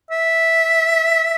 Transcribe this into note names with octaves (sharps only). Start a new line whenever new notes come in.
E5